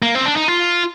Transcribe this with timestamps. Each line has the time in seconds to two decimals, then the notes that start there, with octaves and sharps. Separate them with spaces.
0.02 A#3
0.15 C4
0.25 D4
0.36 D#4
0.48 F4